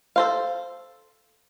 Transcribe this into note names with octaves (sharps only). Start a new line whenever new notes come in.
A4 C5 F5